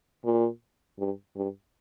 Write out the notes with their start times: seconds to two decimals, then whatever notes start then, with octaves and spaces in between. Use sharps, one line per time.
0.25 A#2
0.99 G2
1.36 G2